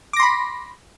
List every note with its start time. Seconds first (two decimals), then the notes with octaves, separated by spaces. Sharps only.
0.13 D6
0.17 A#6
0.20 C6
0.23 B5